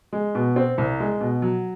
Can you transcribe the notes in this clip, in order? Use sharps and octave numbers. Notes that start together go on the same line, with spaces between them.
G#3
B2
C4
C2
G#3
B2
F#3